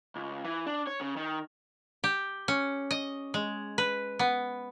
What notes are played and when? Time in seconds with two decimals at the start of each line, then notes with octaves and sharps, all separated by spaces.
0.16 C#2
0.44 E3
0.66 D4
0.87 C#5
1.01 C#3
1.16 D#3
2.04 G4
2.48 C#4
2.91 D#5
3.34 G#3
3.78 B4
4.19 B3